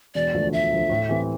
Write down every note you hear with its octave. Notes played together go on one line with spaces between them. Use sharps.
E1 D5
D2 D3 F3 A3
E1 E5
D2 D3 F3 A3
A2
E3 G3 C4